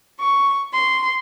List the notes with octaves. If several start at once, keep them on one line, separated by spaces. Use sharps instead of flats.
C#6
C6